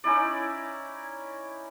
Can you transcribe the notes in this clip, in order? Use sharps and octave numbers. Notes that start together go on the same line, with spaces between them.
C#4 D#4 E4 D5